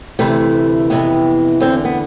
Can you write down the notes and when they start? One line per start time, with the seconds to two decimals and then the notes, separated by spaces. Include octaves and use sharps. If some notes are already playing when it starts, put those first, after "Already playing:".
0.19 D2 C3 E3 A3
0.90 F2 C3 E3 B3
1.60 E2 D3 C4
1.85 B3